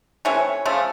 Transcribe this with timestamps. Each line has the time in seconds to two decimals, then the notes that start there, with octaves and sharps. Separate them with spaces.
0.25 C3 E3 A3 C#4 C#5
0.65 C#3 F3 A3